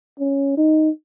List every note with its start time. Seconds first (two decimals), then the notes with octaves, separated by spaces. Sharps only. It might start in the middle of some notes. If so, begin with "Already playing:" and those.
0.20 C#4
0.57 D#4